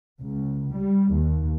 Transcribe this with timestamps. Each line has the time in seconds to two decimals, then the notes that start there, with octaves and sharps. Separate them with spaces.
0.21 C#2
0.75 G3
1.13 D#2